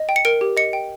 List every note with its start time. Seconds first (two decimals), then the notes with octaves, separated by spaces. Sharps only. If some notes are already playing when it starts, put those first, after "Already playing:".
Already playing: D#5
0.09 G5
0.16 C#7
0.25 A#4 D7
0.41 G4
0.57 D#5 C#7
0.73 G5